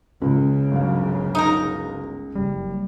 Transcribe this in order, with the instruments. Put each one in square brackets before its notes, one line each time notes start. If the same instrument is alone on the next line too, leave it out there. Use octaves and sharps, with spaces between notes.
[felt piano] C#2 [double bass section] C#3
[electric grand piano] G1 F#3 F5
[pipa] D#4 A#4
[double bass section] F#1 [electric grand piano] G3